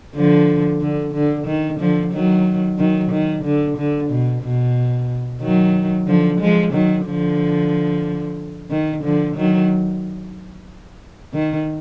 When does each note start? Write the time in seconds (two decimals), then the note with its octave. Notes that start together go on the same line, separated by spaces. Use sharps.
0.15 D3 F3
0.81 D3
1.14 D3
1.47 D#3
1.80 D3 F3
2.13 D#3 F#3
2.78 D#3 F#3
3.11 D#3
3.44 D3
3.77 D3
4.10 B2
4.43 B2
5.41 D#3 F#3
6.07 D3 F3
6.40 F3 G#3
6.73 D#3 F#3
7.06 D3 F3
8.70 D#3
9.03 D3 F3
9.36 D#3 F#3
11.34 D#3